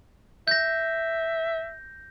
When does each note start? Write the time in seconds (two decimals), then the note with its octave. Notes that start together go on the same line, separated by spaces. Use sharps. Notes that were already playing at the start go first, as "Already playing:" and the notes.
0.48 E5 G6 A#6